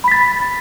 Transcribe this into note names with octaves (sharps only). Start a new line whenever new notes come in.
B5 A6 B6